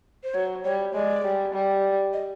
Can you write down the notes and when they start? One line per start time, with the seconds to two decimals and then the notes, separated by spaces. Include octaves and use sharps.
0.24 C5
0.34 F#3 C#5
0.65 G3 C#5
0.93 G#3 D5
1.24 G3
1.53 G3
2.13 D#5